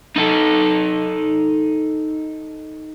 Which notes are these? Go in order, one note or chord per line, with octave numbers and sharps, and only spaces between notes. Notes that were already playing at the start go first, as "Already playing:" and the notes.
D#4 A4